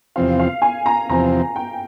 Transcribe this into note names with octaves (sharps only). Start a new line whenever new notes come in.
E2 C3 F3 C4 F5
F5
G#5
A#5
E2 C3 F3 C4 A#5
G5